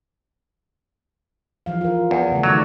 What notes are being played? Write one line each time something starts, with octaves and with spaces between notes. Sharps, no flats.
E3 F3 F5
F4 A#4
E2
C#3 A3
D#3 F#3 D5